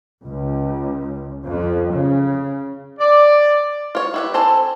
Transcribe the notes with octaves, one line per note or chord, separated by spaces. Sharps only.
C#2
F2
C#3
D5
F4 C#5
E4 G4 B4
C4 A4 C5 G#5